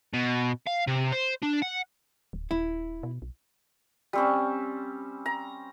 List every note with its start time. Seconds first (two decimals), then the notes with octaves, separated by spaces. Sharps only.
0.13 B2
0.67 F5
0.87 C3
1.12 C5
1.43 D4
1.62 F#5
2.33 D1
2.51 D#1 E4
3.03 B2
3.22 B1
4.13 G3 C4 C#4
5.26 A#5